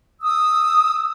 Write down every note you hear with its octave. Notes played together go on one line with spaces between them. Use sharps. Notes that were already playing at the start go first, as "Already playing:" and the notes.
D#6 E6